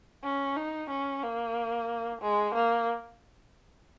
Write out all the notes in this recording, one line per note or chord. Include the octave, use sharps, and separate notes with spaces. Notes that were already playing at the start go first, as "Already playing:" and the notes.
C#4
D#4
C#4
A#3
G#3
A#3